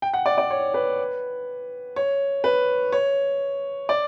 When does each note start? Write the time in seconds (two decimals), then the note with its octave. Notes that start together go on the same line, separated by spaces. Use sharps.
0.02 G5
0.14 F#5
0.26 D5
0.38 D5
0.50 C#5
0.74 B4
1.96 C#5
2.44 B4
2.92 C#5
3.89 D5